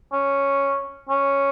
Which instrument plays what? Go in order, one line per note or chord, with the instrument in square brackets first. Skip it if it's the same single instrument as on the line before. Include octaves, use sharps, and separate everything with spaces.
[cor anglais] C#4
C#4